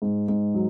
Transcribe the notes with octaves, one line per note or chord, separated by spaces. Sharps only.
G#2
G#2
F#3